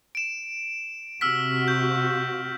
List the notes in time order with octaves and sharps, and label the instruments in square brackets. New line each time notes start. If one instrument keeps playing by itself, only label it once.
[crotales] D7 E7
[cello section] C3 F#4 [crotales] E6 F6 B6
[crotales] G6